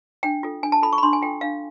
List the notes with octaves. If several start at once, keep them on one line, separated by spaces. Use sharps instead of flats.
D4 G5
F4 A4
D4 G#5
A5
F4 A4 B5
C#6
B5
D4 C6
G#5
F4 A4 G5
D4 F5